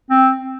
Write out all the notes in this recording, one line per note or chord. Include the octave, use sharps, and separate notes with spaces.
C4